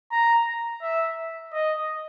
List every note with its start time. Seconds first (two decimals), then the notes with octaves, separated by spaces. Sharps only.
0.12 A#5
0.82 E5
1.53 D#5